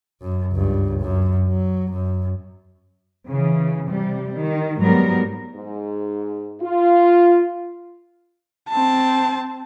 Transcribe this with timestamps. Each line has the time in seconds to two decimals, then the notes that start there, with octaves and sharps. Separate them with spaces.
0.22 F#2
0.53 C#2 G2
1.01 F#2
1.49 F#3
1.91 F#2
3.28 C#3 E3
3.88 C3 G3
4.37 D#3
4.79 G#2 F#3 G3 B3 A#4
5.55 G#2
6.61 F4
8.69 C4 A5